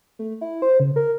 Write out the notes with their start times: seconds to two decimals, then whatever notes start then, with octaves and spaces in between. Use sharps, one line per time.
0.19 A3
0.41 E4
0.62 C5
0.80 C#3
0.96 A#4